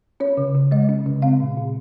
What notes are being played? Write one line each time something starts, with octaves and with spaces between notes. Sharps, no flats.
C#4 C#5
C#3
C#3
G#3 D#5
C#4
C#3
C4 F5
A#2
A#2